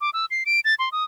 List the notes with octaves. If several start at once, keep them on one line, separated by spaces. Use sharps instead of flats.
D6
E6
C7
D7
A6
C6
D#6